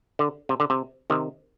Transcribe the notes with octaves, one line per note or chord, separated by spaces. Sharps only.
D3
C3
D3
C3
C3 D#3